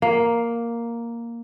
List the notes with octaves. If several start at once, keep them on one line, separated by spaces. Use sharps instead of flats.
A#3